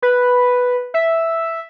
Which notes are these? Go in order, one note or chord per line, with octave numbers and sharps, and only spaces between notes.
B4
E5